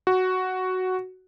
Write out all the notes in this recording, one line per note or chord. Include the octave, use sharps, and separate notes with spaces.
F#4